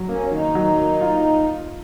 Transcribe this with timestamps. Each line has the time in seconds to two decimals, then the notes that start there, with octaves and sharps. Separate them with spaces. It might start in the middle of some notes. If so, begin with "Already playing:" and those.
Already playing: F#3
0.09 A#3 C#4
0.32 D#3 D#4
0.55 F#3
0.79 A#3
1.01 F4